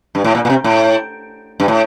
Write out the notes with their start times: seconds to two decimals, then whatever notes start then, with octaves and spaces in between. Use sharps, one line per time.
0.15 G2
0.24 A2
0.35 A#2
0.45 A#2
0.50 C3
0.64 A2
1.60 G2
1.68 A2